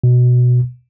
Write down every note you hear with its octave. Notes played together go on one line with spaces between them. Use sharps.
B2